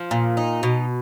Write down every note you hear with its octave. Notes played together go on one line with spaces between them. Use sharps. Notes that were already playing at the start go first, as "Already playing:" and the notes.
Already playing: F3
A#2
D#4
B2